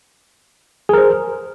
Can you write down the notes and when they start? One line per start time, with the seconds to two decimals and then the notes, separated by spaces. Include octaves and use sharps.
0.89 G#4
0.93 A#4
0.98 C5